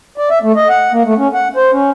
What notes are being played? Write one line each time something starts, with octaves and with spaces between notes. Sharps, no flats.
D5
E5
A3
D#5
F#5
A#3
A3
C#4
F#5
C5
C#4